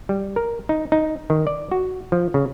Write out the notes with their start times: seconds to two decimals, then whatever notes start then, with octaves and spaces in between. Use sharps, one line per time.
0.09 G3
0.36 A#4
0.69 D#4
0.92 D#4
1.30 D#3
1.47 D5
1.71 F#4
2.12 F3
2.34 C#3